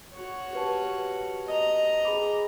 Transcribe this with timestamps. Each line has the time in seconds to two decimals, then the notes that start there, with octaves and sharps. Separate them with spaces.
0.14 F#4 C#5
0.53 G4 B4 A5
1.47 D#5 A#5
2.05 G#4 B5 D6